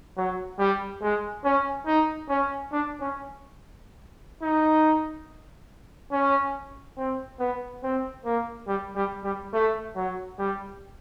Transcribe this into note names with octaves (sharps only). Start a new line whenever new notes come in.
F#3
G3
G#3
C#4
D#4
C#4
D4
C#4
D#4
C#4
C4
B3
C4
A#3
G3
G3
G3
A3
F#3
G3